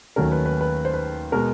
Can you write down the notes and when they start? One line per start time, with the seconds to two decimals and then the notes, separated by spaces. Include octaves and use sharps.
0.16 D#2 D#3 F#3 A3 C#4 A#4
0.32 B4
0.46 B4
0.61 B4
0.85 C5
0.94 B4
1.32 B2 G#3 B3 A#4